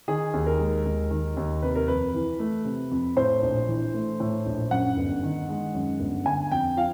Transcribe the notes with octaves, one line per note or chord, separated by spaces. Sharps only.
D#3 G#4
D#2
A#4
G#3
D#2
D#3
D#2
C3 B4
A#4
F2 B4
E3
A3
C3
F2
A2 C5
A#1
E3
A3
A2
A#1
F#2 F#5
G1
D#3
G#3
F#2
G1
D3 G#5
F2 G5
F3 F5